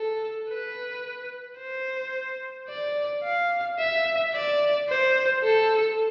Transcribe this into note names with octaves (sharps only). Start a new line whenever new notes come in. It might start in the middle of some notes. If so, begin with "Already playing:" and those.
Already playing: A4
B4
C5
D5
F5
E5
D5
C5
A4